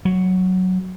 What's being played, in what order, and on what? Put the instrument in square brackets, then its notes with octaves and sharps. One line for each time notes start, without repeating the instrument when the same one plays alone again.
[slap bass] F#3